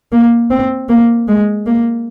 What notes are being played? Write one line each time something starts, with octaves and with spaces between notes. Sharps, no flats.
A#3
C4
A#3
G#3
A#3